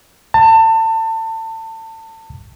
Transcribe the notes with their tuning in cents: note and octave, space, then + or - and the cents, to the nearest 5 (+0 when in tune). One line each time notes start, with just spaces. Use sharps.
A5 +30